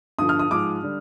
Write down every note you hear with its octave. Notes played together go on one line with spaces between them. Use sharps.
G2 D3 F3 D#6
F6
D#6
G#2 F3 G#3 D6
D3 G3